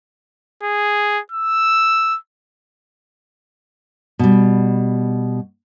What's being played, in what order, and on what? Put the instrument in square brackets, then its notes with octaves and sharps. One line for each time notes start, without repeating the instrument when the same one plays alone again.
[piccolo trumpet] G#4
E6
[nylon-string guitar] B2 G3